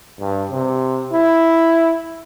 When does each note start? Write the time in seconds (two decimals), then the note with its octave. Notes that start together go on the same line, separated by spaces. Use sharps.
0.20 G2
0.51 C3
1.12 E4